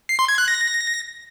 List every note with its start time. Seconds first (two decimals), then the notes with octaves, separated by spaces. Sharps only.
0.09 C7
0.19 C6
0.28 G#6
0.38 F#6
0.48 A#6